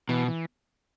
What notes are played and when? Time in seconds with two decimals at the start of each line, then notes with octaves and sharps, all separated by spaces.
0.09 B2 E3
0.28 E3